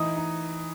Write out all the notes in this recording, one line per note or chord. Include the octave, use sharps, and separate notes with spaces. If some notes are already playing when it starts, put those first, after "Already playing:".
Already playing: E3 D#4 D#6
D#4